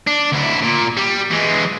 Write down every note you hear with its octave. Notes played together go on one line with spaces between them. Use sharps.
D4
D2 E4
A#2
G3
E3 G#3